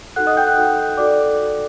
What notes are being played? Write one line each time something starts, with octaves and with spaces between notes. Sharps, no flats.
D#4 F#4 A4 F#5 F#6
D#5 D#6
G5 G6
F#5 F#6
D#4 F#4 A4
D#4 F#4 A4 D5 D6